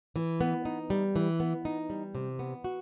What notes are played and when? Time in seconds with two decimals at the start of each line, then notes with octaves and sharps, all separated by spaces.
0.16 E3
0.41 B3
0.65 D#4
0.90 G3
1.16 E3
1.40 B3
1.65 D#4
1.90 G3
2.15 C3
2.39 B3
2.64 F#4